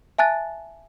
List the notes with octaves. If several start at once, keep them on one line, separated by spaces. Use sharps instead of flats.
E5 G#5 A5 F#6 A6